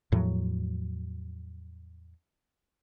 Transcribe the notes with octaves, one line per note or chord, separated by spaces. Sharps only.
E2 A2 F3 F#3